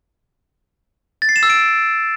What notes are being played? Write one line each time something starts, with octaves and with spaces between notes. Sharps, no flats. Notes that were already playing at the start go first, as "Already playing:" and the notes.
A6
C7
E7
E6
D7